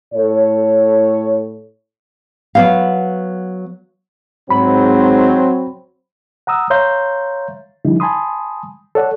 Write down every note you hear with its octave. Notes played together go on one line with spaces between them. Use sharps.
A2 A4 C#5
F#3 B3 F5
G#2 F#3 C4 B5
F#5 A#5 D#6 E6
C#5 E5 F5 A#5 C6 G6
D3 F3 G3 D#4 E4
G#5 A5 B5 C6 D#6
A4 C#5 D5 F#5